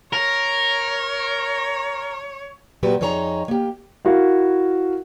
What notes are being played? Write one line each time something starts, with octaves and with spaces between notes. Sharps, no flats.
A#4 C#5
A#2 F#3 F#4 G4 B4
F2 D#4 G#4 C#5 A5 A#5
A#3 G4
E4 F#4 A#4 F5